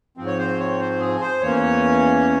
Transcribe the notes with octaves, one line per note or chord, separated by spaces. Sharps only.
G#2 F3 C4
C#5
C5
C#5
C5
G#4
C5
E2 E3 A#3 C#4 C#5